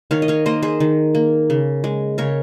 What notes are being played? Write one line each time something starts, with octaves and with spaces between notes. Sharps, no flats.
D#3 C#5 F5
D#5
C#5 F5
A#3 C5 D#5
G#4 C5
D#3
A#3
C#3
G#3
C#3 A#4 C#5